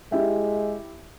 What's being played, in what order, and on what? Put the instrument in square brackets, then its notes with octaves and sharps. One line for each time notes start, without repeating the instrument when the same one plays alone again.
[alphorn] G#3 [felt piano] E4 G4 E5